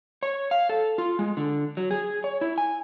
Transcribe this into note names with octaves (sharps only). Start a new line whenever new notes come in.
C#5
F5
A4
F4
G#3
D3
F#3
G#4
C#5
E4
G#5